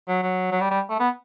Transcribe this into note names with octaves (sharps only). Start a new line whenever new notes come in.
F#3
F#3
F#3
G3
G3
A3
B3